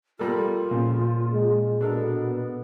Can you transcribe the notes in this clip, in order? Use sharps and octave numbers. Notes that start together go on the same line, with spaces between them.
G3 A#3 F4 A4
A#2 C#3 F3
G#3
B2 B3 D4 A4 A#4